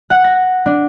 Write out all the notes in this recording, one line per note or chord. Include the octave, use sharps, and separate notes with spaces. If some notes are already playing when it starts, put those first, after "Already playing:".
F#5
A#6
D4